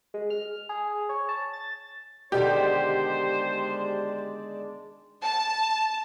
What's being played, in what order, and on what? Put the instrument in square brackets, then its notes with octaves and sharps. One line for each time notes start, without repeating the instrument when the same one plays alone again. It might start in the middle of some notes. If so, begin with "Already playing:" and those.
[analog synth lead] G#3
F6
G#4
C#5
A5
A6
[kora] B2 D3 D#3 [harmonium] G#3 D5 A5 [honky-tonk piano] G4 [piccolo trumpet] C5
[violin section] A5